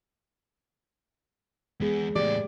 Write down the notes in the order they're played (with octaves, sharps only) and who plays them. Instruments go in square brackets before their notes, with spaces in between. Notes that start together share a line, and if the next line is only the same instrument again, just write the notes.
[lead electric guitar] E2 B3 [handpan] G#3 G#4
[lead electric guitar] E2 A2 [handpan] G4 [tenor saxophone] D5